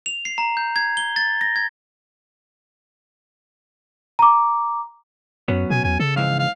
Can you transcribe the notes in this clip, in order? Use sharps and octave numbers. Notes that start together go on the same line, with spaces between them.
F7
C7
A#5
G6
G#6
G7
A6
A#6
G#6
A#5 D6
F#2 F#3 B3 C#4
B2 G#5
E2 G#5
C#3 A4
F2 G#2 E3 F5
F5